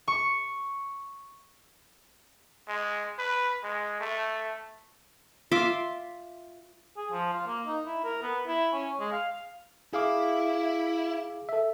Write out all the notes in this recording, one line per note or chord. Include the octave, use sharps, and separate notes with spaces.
C#6
G#3
B4
G#3
A3
F4 E5 C6 D6
G#4
F3
F4
A#3
D#4
E4
A#4
B3
E4
C#4
G#3
F5
E4 G#4 F5 D6
A4 E5